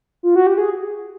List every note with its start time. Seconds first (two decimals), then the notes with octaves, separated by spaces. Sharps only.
0.23 F4
0.36 F#4
0.47 G4
0.58 G#4